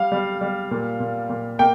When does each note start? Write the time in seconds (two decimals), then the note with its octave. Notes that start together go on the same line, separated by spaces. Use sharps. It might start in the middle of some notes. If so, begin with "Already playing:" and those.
Already playing: G3 F5
0.12 G3
0.41 G3
0.71 A#2
1.00 A#2
1.29 A#2
1.59 A#3 G5